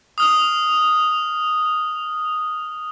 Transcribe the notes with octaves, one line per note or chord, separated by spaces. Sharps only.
D#6 F6 F7